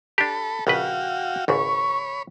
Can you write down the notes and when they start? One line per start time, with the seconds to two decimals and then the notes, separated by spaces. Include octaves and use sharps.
0.18 D4 G4 A4 B5
0.67 A#1 C#3 F#4 B4 F5 G5
1.48 G#1 C#2 G#2 C#5 B5 C#6